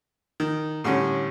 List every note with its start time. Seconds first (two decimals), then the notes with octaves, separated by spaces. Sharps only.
0.40 D#3
0.84 A2 D3 G3 C#4